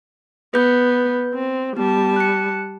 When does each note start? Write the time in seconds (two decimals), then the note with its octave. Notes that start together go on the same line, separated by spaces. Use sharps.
0.54 B3 B4 G6
1.34 C4
1.77 G3 B3 A5
2.16 F#6 C#7